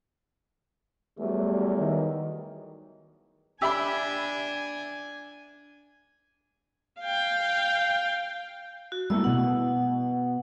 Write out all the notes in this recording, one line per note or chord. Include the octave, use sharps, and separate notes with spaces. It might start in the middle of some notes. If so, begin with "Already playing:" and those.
E2 F#3 G3 A3
D#3
D4 G4 E5 G#5 B5 E6
F5 G5
F#4
G3 A3 A#3 E4 E6
B2 B3 F#5